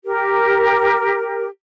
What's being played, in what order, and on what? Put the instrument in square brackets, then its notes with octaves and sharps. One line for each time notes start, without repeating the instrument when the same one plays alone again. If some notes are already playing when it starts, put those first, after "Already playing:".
[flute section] G4 A#4